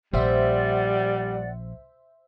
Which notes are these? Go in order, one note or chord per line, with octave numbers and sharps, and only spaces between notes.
A#1 G3 C5 D5 E5 F#5